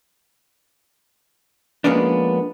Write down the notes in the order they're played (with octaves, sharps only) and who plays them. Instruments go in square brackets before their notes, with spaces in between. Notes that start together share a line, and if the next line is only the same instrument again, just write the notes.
[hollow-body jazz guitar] F3 G#3 A#3 B3 C#4 D4